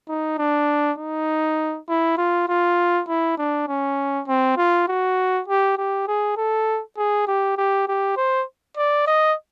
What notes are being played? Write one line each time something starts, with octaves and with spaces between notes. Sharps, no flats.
D#4
D4
D#4
E4
F4
F4
E4
D4
C#4
C4
F4
F#4
G4
G4
G#4
A4
G#4
G4
G4
G4
C5
D5
D#5